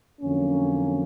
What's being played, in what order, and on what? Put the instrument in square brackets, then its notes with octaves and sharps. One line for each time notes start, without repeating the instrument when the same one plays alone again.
[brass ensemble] F2 D3 F#3 A#3 C#4